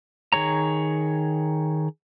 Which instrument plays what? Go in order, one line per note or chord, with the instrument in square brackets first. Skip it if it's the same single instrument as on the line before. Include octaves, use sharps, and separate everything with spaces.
[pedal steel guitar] D#3 G#4 C#5 A#5